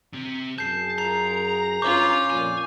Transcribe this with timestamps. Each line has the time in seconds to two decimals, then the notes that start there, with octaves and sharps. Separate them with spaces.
0.13 C3 C4
0.58 F#2 G#4 A5 G6 C7
0.98 F4 A#4 A#5 C7
1.82 G2 C#4 F4 C#6 D6 G6
2.30 F2 A#2 G#5